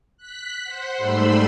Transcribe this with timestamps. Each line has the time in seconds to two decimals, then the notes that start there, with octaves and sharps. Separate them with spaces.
0.17 F#6 B6
0.64 C5 F#5
0.98 G#2 G3 A3 B5 C6 E6